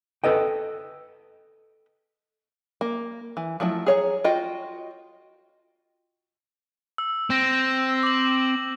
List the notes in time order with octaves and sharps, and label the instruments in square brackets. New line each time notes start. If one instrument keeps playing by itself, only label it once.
[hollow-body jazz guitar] A4 B4 D#5 G5
[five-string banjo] A#3
E3
F3 F#3 A3 E4
G#4 C#5 A#5
F4 F#4 D#5 G5
[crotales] E6
[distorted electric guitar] C4 [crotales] G6 A#6 D7
[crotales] D6 F#7